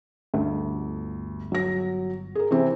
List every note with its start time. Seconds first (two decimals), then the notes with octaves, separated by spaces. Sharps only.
0.34 G1 D2
1.52 F#3 A#6
2.35 G#4 A#4
2.51 C3 E3 C4